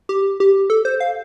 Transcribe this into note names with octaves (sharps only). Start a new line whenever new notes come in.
G4
G4
A4
C5
F5